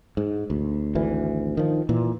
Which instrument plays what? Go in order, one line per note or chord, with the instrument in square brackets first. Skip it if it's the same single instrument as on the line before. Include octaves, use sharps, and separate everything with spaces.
[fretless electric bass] G#2
D2
G#1 D2 E3
D#3 F3
A#2 E3